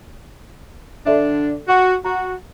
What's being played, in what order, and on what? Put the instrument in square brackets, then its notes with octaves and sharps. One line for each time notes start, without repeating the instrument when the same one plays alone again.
[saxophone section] D3 D4 [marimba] A4 D5 E5
[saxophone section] F#4
[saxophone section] F#4 [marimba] A#5